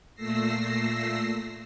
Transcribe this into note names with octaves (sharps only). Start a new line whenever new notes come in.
A#2 A3 E6 A#6 C7